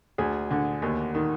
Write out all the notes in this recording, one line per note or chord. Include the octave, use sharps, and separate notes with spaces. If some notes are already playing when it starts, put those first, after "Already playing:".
D2 G#4
D3
D#2
D#3